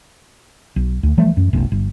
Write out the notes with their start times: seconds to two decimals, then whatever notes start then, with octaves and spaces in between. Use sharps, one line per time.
0.76 B1
1.03 D2
1.18 E3 F3 G3 A3
1.37 F#2
1.53 F1 B1
1.72 G1